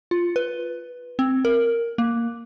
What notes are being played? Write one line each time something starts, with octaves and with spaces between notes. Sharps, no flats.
F4
B4
C4
A#4
A#3